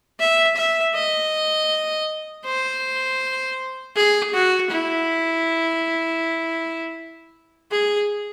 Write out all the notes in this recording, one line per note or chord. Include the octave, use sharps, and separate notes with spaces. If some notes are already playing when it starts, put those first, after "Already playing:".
E5
E5
D#5
C5
G#4
F#4
E4
G#4